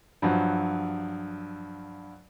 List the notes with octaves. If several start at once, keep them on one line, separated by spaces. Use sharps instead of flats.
G2 F3 F#3